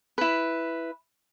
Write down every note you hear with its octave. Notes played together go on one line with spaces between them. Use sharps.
E4 B4